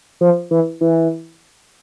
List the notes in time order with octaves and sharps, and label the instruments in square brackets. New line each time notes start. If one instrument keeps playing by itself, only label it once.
[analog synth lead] F3
E3
E3